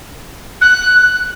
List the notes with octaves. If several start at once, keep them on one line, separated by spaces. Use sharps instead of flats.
F#6